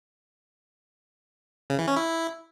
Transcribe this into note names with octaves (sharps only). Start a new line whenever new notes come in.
C#3
E3
C#4
E4